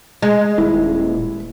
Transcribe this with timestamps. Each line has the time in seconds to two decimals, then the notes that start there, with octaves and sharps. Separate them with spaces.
0.22 G#3
0.58 D#1 E4